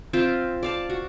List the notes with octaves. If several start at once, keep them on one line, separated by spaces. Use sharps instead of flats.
C4 F4 E5 G5
D5 F5 A5
F#4